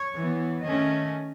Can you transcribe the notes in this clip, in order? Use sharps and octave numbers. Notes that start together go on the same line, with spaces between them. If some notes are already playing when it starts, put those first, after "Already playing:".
Already playing: C#5
E3 B3
D#3 A3 C#4 D#5